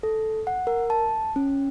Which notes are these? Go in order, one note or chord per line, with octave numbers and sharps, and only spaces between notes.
A4
F#5
A#4
A5
C#4